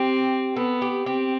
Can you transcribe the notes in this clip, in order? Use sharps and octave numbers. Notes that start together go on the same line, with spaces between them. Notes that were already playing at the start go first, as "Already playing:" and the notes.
Already playing: C4 G4
B3 A4
G4
C4 G4